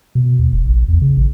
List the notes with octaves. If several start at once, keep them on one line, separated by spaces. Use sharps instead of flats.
B2
D#2
F1
A#1
E2
C#3
A1